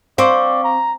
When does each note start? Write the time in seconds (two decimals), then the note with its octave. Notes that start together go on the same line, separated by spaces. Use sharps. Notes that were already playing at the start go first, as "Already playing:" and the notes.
0.18 C4 D5 F5 C#6 D6
0.64 A#5